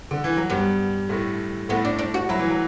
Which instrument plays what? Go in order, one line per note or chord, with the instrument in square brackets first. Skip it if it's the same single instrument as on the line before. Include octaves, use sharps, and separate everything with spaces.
[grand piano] D3
E3
F#3
[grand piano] G2 G3 [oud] B3
[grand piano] A2 A3
[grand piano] A2 A3 [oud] B3
[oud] D4
D4
F#4
[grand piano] F#3 [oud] E4
[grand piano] E3
F#3